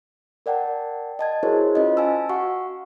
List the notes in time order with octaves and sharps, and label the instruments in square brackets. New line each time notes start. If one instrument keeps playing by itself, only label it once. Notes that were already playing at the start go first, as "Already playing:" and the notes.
[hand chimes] A#4 D5 F#5 G5 A5
D#5 A5 G#6
E4 F#4 G#4 A#4 C5 C#5
C#4 F4 C5 D#5
F5 G#5 A5 E6
F#4 F5 F#5 C#6